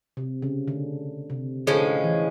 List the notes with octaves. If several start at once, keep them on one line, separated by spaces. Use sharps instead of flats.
C3
C#3
D3
C3
A2 D3 F3 G#3 C#4
E3